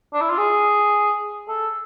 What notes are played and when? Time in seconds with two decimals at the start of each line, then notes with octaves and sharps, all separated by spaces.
0.13 D4
0.21 E4
0.30 F4
0.38 G#4
1.48 A4